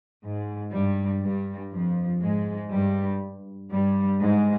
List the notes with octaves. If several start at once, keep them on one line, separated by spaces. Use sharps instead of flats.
G#2
G2 G3
G2 G3
F2 F3
G#2 G#3
G2 G3
G2 G3
G#2 G#3